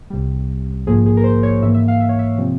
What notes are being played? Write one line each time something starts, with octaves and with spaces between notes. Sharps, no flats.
C2 C3 G3
A#1 G#2 F3 A#3 G#4
G#4
A#4
C5
C#5
G#2 E3 A#3 E5
E5
F5
E5
C#5
E5
C3 F3 C4